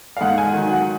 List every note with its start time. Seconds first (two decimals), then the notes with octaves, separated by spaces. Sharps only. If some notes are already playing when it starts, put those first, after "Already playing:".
0.17 F5
0.21 G#2 F#5
0.38 G#5
0.54 D#3 F#3
0.69 F#5